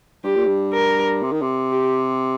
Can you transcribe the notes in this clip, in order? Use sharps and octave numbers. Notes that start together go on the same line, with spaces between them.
G2 G4
A#2
G2
A#4
C3
D#3
C3
G4